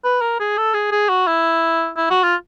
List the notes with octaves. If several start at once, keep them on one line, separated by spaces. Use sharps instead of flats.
B4
A#4
G#4
A4
G#4
G#4
F#4
E4
E4
F#4
F4